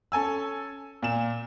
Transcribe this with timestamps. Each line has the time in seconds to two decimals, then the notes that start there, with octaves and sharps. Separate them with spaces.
0.12 C#4 A4 G#5 E6
1.02 A#2 E7